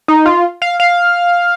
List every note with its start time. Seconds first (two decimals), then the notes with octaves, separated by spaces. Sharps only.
0.08 D#4
0.26 F4
0.62 F5
0.80 F5